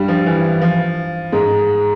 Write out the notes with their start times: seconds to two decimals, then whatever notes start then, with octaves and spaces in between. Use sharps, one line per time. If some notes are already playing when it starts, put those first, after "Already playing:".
Already playing: G2 G3
0.08 F3
0.26 E3
0.62 F3
1.32 G#2 G#3